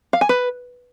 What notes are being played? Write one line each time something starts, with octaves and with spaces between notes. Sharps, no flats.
F5
G#5
B4